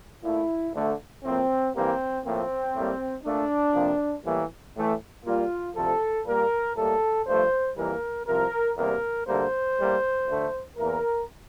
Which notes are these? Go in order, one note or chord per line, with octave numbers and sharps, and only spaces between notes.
A#2 A3 E4
D2 D3 A3
A2 F3 A#3 C4
G2 E3 G3 A#3 C4
A2 F3 A#3 C4
A2 G3 A#3
A#2 A3 D4
F2 C3 F3 A#3
A2 E3 G3 A#3
A2 E3 A3
A#2 G3 A#3 F4
D2 C3 F3 A4
A#2 G3 A#3 A#4
A2 G3 A#3 A4
G2 F3 A3 C5
F2 E3 G3 A#3 A#4
C2 C3 F3 A#4
E2 C3 G3 A#3 A#4
D2 D3 G3 A#3 C5
A2 G3 A#3
D2 D3 A3
E2 E3 A#3 A#4